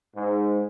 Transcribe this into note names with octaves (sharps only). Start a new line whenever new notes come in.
G#2